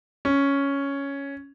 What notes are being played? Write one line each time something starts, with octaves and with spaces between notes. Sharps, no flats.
C#4